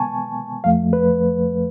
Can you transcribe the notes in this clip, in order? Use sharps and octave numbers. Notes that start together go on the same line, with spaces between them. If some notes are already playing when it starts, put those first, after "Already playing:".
Already playing: B2 G#3 B3 G#5 A5 C#6
F2 F3 A3 F5
B4